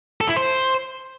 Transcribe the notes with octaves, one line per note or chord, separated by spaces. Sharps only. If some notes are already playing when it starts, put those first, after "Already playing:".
A4
E4
C5